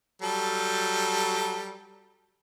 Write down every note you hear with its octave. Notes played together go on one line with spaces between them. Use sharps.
F#3 G3 A4